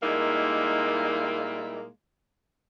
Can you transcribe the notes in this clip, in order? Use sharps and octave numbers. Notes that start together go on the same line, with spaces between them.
A#2 G3 G#3 A#3 D#4 E4